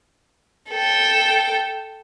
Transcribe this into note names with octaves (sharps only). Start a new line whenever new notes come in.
A4 G5